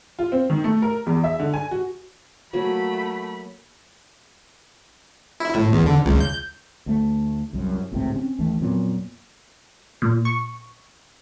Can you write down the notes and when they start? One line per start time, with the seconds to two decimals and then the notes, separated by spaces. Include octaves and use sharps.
0.19 F4
0.32 C4
0.50 D#3
0.64 A3
0.82 A#4
1.06 E2
1.24 E5
1.40 D3
1.54 G#5
1.71 F#4
2.53 F#3 A3 A#3 B5
5.40 E4
5.55 A2
5.73 E2
5.86 D3
6.05 C#2
6.20 G6
6.86 D2 A3
7.53 C2 F#2
7.92 G#1 C#2 A2 C3
8.16 C4 C#4
8.39 D#2 E3 A3
8.61 F2 A#2 F#3 B3
10.02 A#2
10.25 C#6